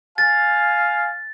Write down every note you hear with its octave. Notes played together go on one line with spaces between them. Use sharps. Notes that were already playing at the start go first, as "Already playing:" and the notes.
F5 G#5 A6